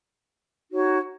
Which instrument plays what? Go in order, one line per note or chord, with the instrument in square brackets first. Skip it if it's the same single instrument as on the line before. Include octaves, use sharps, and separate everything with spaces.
[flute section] D#4 F#4 C#5